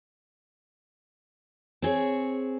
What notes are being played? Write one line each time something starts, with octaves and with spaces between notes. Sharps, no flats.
C4 G#4 C#5